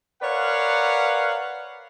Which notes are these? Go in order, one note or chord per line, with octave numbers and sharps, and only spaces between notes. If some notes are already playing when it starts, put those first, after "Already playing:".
A#4 B4 C#5 D5 F5 F#5